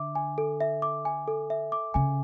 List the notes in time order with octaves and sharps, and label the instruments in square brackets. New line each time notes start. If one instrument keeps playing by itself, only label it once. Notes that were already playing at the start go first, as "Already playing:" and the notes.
Already playing: [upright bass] D3 [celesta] E5 D6
[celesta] G#5
A4
E5
D6
G#5
A4
E5
D6
[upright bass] C#3 [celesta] G#5